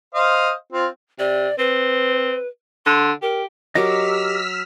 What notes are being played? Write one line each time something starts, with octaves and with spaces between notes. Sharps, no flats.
C5 D#5 F5
C4 F4
C3 D5
C4 B4
D3 C6
G4 A#4
F#3 G4 A#4 D#5 D6 E6 F6 B6